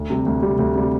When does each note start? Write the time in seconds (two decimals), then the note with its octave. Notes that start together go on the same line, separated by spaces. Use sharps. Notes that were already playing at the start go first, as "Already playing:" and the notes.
Already playing: D2
0.10 C3 G3
0.26 D2
0.42 C3 G3
0.59 D2
0.75 C3 G3